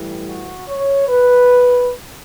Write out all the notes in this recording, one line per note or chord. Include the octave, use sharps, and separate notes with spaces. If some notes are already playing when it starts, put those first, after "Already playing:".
Already playing: A2 E3 G3
F#4
C#5
B4